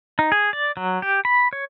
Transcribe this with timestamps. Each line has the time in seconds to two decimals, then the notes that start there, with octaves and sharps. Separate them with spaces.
0.19 D#4
0.32 G#4
0.53 D5
0.77 F#3
1.02 G4
1.25 B5
1.53 C#5